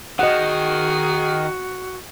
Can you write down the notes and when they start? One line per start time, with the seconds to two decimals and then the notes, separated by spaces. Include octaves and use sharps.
0.19 D#3 F#4 G#4 D#5 F#5